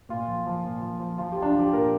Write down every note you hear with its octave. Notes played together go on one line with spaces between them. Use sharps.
A#2 F4
F3
F3
A#2
F3
F3
F3 F4
F3 G4
D4
F4
F3 G4
A#2 A#4